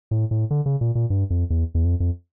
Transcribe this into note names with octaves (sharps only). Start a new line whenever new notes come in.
A2
A2
D3
C#3
A#2
A#2
G2
F2
E2
E2
F2
F2